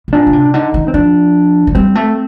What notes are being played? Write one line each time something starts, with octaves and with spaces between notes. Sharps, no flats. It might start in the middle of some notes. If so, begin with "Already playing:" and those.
A2
A#2 D4
D3
C3
D3 D#4
D#3
C4
F3 D4
F3
G3 C4
A3